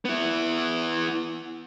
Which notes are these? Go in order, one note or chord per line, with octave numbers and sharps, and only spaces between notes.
B3 E4